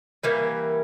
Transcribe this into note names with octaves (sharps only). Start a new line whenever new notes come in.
E3 G3 A#3